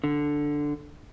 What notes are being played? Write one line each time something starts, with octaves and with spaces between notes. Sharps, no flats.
D3